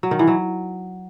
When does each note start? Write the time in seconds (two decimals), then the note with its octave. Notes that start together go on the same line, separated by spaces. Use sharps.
0.03 F#3
0.11 D#3
0.19 E3
0.27 F#3